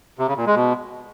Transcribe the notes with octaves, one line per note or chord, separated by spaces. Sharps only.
C3
C#3
A#2
G#3
B2